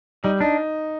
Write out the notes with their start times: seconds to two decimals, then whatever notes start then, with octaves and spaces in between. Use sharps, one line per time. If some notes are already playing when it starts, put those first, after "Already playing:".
0.24 G3 D#4
0.41 D4 D#4